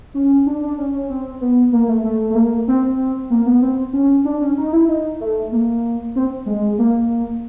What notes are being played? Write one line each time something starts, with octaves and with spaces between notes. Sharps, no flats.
C#4
D4
D4
C#4
C#4
C4
B3
A#3
A3
A3
A3
A#3
C4
A#3
B3
C4
C#4
D4
C#4
D#4
E4
D#4
A3
A#3
C4
G#3
A#3